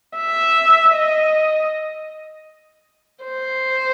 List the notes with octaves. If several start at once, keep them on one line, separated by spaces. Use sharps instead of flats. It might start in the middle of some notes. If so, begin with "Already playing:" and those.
E5
D#5
C5